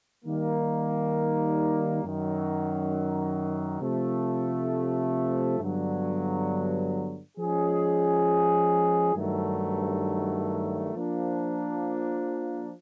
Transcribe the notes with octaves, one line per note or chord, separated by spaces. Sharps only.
D#3 G3 A#3
F#2 D#3 F#3
C3 F3 A3
G2 D3 F#3 B3
F3 G#3 C#4 F4 G#4
G2 D#3 F#3 A3
F3 A#3 D4